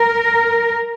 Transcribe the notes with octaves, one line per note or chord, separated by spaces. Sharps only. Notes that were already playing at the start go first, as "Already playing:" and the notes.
Already playing: A#4